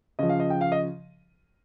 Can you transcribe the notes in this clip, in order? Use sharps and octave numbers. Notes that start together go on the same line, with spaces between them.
C#3 F3 D#5
F5
D#5
G5
F5
D#5